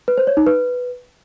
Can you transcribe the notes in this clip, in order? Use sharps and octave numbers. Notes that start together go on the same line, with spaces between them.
B4
C5
C#5
D#4
B4